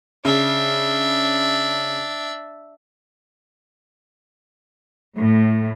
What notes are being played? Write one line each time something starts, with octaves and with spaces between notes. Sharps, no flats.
C#3 D4 E5
A2